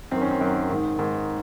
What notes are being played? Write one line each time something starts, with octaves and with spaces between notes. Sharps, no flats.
F#2 D#3 C4
C#4
C4
F#2 D#3
G#2 D#3
G#2 D#3